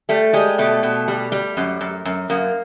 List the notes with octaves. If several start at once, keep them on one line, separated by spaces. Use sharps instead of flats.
G3 A3
G3 G#3
B2 A3
B2
G3
G3
F#2
F#2
F#2
F#2 A#3